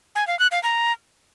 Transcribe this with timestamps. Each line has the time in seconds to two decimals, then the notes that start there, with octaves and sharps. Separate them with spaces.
0.15 G#5
0.27 F5
0.39 F#6
0.51 F5
0.63 A#5